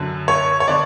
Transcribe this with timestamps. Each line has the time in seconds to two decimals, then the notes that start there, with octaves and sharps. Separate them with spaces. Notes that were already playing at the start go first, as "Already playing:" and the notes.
Already playing: F#2 D3
0.28 C#5
0.60 C#5
0.68 D3 D5